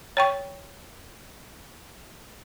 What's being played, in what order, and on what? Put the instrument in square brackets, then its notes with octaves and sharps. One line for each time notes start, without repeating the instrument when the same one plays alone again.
[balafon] C#5 G5 C#6